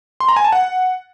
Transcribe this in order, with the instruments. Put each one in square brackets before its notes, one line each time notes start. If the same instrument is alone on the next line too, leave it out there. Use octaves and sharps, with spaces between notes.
[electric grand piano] C6
A#5
G#5
A5
F#5